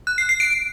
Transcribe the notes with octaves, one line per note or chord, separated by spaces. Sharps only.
F#6
C7
C7
D7